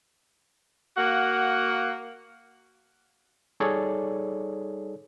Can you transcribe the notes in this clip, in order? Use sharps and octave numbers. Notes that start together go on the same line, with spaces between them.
A#3 F#4 F5 F#5
G3 D#4 G#4 A4 C#5 D5